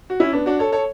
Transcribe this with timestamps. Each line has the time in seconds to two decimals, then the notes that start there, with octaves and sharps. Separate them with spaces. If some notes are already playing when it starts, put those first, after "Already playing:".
0.10 F#4
0.20 C#4 E4
0.33 B3 D4
0.46 D4 F#4
0.59 A4 C#5
0.72 A4 C#5